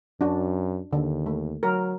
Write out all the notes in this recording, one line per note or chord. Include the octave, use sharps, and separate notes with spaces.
F#2 D4 F#4
D#2 D3
A3
F#3 A#4